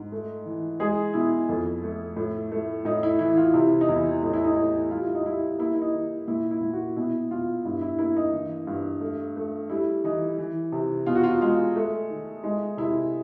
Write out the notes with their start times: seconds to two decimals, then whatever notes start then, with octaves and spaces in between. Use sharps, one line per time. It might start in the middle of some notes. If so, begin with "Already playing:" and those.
Already playing: G#2
0.12 A3
0.46 E3
0.80 G#3 G#4
1.14 B2 E4
1.49 F2
1.83 A3
2.16 A2
2.52 A3
2.85 A2 D#4
3.03 E4
3.19 E3 E4
3.37 F4
3.54 C3 E4
3.81 D#4
3.89 E2 E4
4.23 A2 D#4
4.34 E4
4.44 D#4
4.56 A2 D#4
4.91 G3 F4
5.03 E4
5.15 D#4
5.26 G3 E4
5.59 A#3 E4
5.75 E4
5.82 D#4
5.93 D#3
6.28 A#2 E4
6.51 E4
6.61 A#2
6.73 F#4
6.97 B2 E4
7.31 B2 F4
7.65 G2 E4
7.82 E4
7.99 A#3 E4
8.16 D#4
8.33 E3
8.67 G2
9.01 A3
9.36 A3
9.70 G3 E4
10.04 E3 D#4
10.38 E3
10.72 C3
11.06 B2 F4
11.15 F#4
11.23 F4
11.41 G#3 F4
11.76 A3
12.10 D#3
12.43 G#3 D#4
12.77 C3 E4